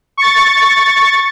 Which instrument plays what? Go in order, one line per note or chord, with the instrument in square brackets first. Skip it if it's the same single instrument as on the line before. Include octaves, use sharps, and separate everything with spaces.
[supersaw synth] C#6 A6